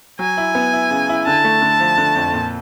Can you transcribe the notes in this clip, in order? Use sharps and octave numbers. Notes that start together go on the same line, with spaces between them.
F#3 G#5
E4
B3
E4
C#3
E4
D3 A5
A3
D3
F3
D3
F2
A#2